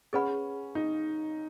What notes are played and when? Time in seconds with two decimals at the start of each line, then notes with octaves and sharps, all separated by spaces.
0.13 C#4 G#4 B4 F#5 B5
0.75 D#4